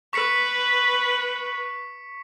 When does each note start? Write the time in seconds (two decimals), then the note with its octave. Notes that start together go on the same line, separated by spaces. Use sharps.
0.13 B4 C#6 B6 C#7